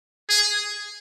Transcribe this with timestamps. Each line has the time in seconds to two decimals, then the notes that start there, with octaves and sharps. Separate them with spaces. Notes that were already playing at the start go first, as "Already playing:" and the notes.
0.29 G#4